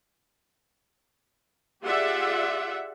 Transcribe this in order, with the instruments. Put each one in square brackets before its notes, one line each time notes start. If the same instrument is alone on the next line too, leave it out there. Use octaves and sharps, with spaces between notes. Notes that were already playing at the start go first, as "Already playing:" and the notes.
[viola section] F4 G4 G#4 D5 E5 F#5